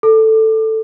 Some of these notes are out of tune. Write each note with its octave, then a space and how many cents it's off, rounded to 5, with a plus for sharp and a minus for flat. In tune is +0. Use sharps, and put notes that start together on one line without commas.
A4 +5